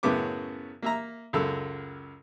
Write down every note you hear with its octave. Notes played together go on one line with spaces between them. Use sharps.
F#2 A2 C#3 B3 D6
A#3 E5 A#5
C#2 F#2 A4 E6